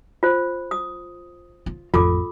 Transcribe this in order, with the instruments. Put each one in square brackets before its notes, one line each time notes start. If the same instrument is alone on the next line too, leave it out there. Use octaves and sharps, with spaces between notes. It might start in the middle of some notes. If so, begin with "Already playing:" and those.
[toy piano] F4 C5
D#6
[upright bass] F4
[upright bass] A1 F2 [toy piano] F4 A4 D6